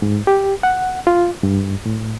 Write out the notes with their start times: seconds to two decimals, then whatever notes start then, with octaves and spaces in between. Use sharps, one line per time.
0.02 G#2
0.27 G4
0.63 F#5
1.07 F4
1.43 G2
1.86 A2